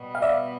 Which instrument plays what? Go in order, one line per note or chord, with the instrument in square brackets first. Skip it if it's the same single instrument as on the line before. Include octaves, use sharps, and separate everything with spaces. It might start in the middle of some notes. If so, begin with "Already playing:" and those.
Already playing: [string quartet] B2 G3 B3
[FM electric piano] F5
D5 E5